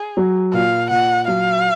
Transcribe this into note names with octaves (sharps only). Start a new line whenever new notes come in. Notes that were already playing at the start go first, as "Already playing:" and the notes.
Already playing: G#4
F#3
A#2 F5
A#2 F#5
F#3 F5